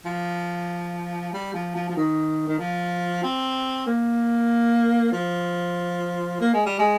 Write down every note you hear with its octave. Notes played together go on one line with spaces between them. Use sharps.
F3
G3
F3
F3
F3
D#3
D#3
F3
C4
A#3
F3
A#3
G#3
G3
G#3